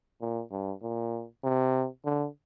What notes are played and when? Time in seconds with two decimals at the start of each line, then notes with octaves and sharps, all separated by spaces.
0.21 A#2
0.51 G2
0.82 A#2
1.43 C3
2.05 D3